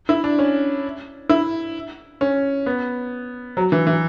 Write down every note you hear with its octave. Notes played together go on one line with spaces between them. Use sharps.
E4
D4
C#4
E4
C#4
B3
F#3
E3
E3